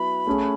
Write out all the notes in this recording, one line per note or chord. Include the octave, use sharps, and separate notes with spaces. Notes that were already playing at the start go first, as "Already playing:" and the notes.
Already playing: F#3 B3 E4 B5
A3 C#4 G#4